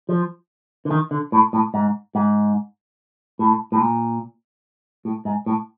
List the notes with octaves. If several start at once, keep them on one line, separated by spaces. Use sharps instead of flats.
F3
D3
D#3
D3
A2
A2
G#2
G#2
A2
A2
A#2
A2
G#2
A2